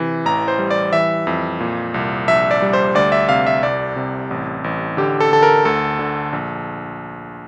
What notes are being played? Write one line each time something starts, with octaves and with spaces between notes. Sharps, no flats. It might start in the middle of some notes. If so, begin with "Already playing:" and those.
Already playing: C3 E3
A1 A#5
C5
G3
D5
E3 E5
F2
A#2
C2
A#1 E5
D5
G3
C5
D2 D5
E5
C3 F5
E5
C2 D5
C3
A1
A1
D3 G4
A4
D3 A4
A#4
D2 A4
D3
A#1